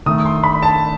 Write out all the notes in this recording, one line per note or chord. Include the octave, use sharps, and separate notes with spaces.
D#3 A3 D#6
C6
B5
A5